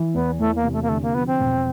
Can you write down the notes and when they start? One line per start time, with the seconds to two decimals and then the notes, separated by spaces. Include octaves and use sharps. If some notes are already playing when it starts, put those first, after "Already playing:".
Already playing: E3
0.14 E2 B3
0.39 E2 A3
0.56 A#3
0.64 C3
0.73 A3
0.82 A#3
0.89 D3 A3
1.02 A#3
1.14 F3 B3
1.27 C4
1.40 E1